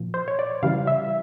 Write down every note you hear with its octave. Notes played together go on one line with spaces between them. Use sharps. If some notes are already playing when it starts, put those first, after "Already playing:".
Already playing: A#2 F3
C5
C#5
D5
C#3 E3 G3 F5
E5